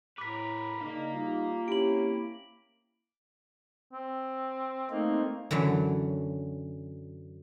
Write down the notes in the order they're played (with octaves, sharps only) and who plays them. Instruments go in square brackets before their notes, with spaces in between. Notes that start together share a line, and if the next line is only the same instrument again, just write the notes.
[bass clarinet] A2 [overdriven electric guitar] A#4 B4 [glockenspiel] D6 B6
[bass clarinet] C#3 [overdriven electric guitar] A#3 [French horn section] D4 D#4
[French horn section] G3 F4 [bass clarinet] D#4
[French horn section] C4 C#4 G4 [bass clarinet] E4 [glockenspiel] D7 F#7
[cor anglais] C4
[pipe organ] A3 C4 D#4 [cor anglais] A#3
[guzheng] F#2 D3 E3 F#3